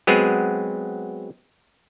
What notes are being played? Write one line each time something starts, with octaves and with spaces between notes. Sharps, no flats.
F#3 G#3 B3 C4 G#4